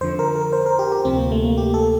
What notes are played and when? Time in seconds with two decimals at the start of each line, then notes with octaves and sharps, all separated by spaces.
0.01 F2 D3 F3 C5
0.19 A#4
0.35 A#4
0.53 C5
0.66 A#4
0.79 G4
0.92 G4
1.05 D2 C3 F3 C4
1.18 A#3
1.32 A3
1.44 A#3
1.58 G4
1.74 A4